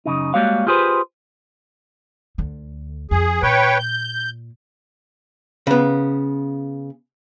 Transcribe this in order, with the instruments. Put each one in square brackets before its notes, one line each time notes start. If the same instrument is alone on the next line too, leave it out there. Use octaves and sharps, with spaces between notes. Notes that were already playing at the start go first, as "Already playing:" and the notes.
[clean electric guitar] F#2 C#3 D#4
G3 G#3 A#3 F#4 C#5 F5
F4 G4 G#4 B4 C5
[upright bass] D2 D3
[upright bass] F2 [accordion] G#4
[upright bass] A#2 [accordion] B4 C#5 G5
[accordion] G6
[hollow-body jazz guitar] C#3 B3